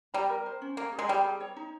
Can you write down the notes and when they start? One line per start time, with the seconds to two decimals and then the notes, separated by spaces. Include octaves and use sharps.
0.14 G3 A#5
0.30 A#4
0.46 C5
0.62 C#4
0.77 A#3 A#5
0.92 G#4
0.99 G#3
1.08 G3 G5
1.24 G#4
1.40 C#5
1.56 D#4